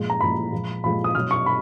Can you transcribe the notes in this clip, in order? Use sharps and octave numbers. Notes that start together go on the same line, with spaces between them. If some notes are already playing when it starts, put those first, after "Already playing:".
Already playing: A#2 F3 G#3
A#5
A#2 F3 G#3 B5
A#2 F3 G#3
A#2 F3 G#3 B5
D#6
B2 F#3 F6
C#6
B5